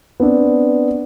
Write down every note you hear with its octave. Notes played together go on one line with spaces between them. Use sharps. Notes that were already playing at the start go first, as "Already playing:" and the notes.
B3 C4 D4